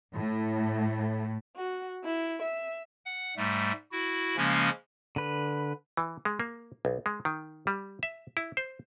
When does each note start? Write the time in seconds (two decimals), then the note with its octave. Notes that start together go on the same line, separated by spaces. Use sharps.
0.15 A2
1.57 F#4
2.03 E4
2.41 E5
3.05 F#5
3.37 G#2 G3 A3
3.92 E4 F#4
4.37 C#3 F3 G#3 A#3 C#4
5.16 D3 B4
5.97 E3
6.25 G#3
6.40 A#3
6.85 B1
7.06 G#3
7.25 D#3
7.67 G3
8.03 E5
8.37 E4
8.57 C5